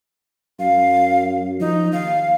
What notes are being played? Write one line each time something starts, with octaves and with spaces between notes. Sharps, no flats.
F#2 F5
F3 D#4
D#2 F5